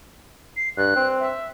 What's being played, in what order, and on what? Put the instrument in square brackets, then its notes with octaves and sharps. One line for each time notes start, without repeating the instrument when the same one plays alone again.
[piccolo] C7
[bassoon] G2 [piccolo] F#6
[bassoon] C4
[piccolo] E5